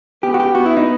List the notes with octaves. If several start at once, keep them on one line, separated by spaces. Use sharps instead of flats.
B3 G4
F#4
G4
B3 F#4
E4
D#4